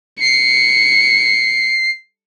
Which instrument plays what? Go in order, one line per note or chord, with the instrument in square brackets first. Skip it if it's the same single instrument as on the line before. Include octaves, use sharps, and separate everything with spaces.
[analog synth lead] C7 [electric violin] C#7